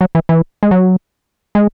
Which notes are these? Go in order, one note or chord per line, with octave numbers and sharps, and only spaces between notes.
F#3
E3
E3
G#3
F#3
G#3